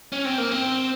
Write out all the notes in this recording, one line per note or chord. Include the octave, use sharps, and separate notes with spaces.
C#4
C4
A#3
C4